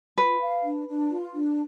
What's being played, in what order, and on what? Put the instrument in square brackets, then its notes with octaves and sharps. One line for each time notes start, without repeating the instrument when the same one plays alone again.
[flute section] F4 [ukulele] B4
[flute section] F5
D4
D4
F4
D4